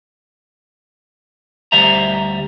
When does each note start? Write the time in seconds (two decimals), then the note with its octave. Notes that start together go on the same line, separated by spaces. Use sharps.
1.72 D2 G3 C5 E5 A#5